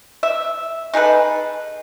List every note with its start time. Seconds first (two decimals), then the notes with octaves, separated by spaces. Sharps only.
0.23 E5
0.94 D#4 G#4 A4 B4